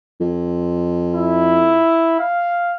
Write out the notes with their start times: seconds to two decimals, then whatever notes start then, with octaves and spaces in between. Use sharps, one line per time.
0.20 F2
1.15 E4
2.20 F5